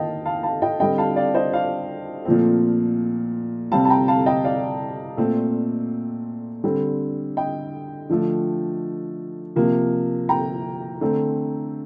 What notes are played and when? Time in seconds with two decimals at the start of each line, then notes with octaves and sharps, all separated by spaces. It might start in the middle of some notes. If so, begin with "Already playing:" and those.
Already playing: D#3 A#3 D#5 F5 G5 A5
0.26 F5 A5
0.43 F5 A5
0.62 D#5 G5
0.80 D3 G3 C4 D#5 G5
0.98 F5 A5
1.16 D5 F5
1.35 C5 D#5
1.53 D5 F5
2.25 A#2 F3 A3 C4
3.72 C3 G3 C4 F5 A5
3.85 A5
3.90 G5 A#5
4.08 F5 A5
4.26 D#5 G5
4.44 D5 F5
5.17 A#2 A3 C4
6.64 D3 G3 C4
7.37 D#5 G5
8.10 D3 F3 A3
9.56 C3 F3 A#3
10.29 G5 A#5
11.01 D3 A3 C4